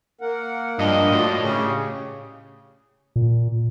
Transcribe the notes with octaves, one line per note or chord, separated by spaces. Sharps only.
A#3 A#4 F#5
G2 F3 D4 D#5
A2 F4 F#4 D5
C#3 G4 G#4
A#2